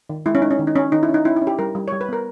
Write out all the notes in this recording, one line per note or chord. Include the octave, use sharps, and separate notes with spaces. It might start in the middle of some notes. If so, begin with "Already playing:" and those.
D#3
G#3 E4
C#4
G#3 D#4
C#4
D#3
D#4
C#4
D#3 D#4
E4
C#4
D#4
C#4 E4
E4
C#4
G4
G3 A#4
G3
G3 C#5
B4
B3 A#4